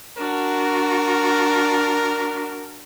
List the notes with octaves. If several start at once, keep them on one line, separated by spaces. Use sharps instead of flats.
D4 F#4 A#4